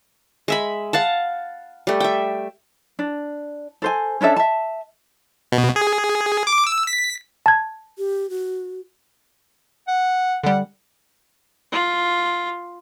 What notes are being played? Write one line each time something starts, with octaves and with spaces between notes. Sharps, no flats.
G#3 E5 B5
F5 F#5 A5
G3 A3
E5 G5
D4
A4 C5 G#5
C#4 D4 A4 E5
E5 A5
B2
G#4
D6
E6
B6
A5 G#6
G4
F#4
F#5
D3 G3 F#5
F4